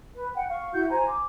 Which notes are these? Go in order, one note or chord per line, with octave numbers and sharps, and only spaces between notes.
B4
F#5 G5
F5 C#6
E4 F#4 F#5 G6
C5 G#5 A#5
D6